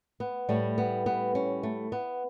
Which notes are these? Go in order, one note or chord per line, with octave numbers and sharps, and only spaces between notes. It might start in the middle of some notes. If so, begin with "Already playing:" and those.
B3
A2 G3 A3
B3
B3
C#4
A3
B3